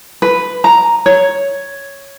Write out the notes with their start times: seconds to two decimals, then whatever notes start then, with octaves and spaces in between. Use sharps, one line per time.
0.22 B4
0.64 A#5
1.06 C#5